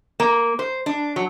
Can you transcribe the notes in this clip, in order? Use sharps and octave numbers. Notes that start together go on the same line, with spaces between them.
A#3
C5
D4
F#3